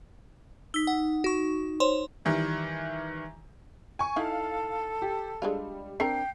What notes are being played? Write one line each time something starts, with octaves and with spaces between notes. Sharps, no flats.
D#4 E6 B6
F#5
F#4 C#6
C5 C#5 C6
D#3 E3 G3
G#5 C#6
D#4 E4 A4 F5
G4
G3 G#3 D4 F4
C4 D4 A#4 G5 C7